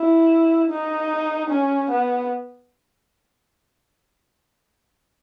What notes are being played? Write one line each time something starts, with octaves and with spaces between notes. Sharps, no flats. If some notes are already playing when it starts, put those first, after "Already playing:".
Already playing: E4
D#4
C#4
B3